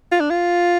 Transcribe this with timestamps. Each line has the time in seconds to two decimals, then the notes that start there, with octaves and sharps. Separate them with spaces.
0.12 F4
0.20 D4
0.30 F4